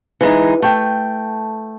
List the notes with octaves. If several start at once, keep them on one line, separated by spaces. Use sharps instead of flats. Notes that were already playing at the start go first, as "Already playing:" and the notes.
E3 G#3 D#4
A3 G5